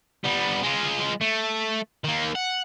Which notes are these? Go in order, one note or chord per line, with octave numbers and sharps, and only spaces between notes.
G3 B3
G#3 F4
A3
D#3 A#3
F#5